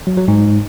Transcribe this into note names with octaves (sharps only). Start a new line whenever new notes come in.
F#3
F#3
G#2